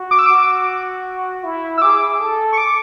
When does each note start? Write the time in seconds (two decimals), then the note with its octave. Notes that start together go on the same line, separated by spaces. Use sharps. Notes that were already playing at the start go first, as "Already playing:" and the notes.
Already playing: F#4
0.11 D6
0.19 E6
0.26 F#4 D6
1.44 E4
1.78 E6
1.82 G#4 D6
2.20 A4
2.53 C#6
2.58 D6